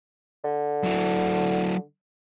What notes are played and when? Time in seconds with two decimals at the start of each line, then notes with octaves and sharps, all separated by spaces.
0.44 D3
0.84 F#3 E4